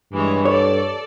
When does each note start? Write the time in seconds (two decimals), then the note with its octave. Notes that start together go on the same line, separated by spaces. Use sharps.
0.13 G2 E3 G#3 C#5
0.45 A4 C#5 D5